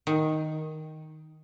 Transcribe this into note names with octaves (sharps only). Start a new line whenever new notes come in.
D#3